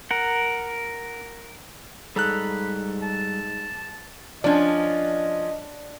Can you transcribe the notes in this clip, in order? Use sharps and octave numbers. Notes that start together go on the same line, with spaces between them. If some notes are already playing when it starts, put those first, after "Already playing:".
A#4 F#5
G#2 G3 G#4 A4 A#5 B5 F#6
A5
F3 C#4 D4 D5 D#5